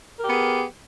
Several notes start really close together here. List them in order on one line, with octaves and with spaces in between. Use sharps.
A#4 G4 B3 G#4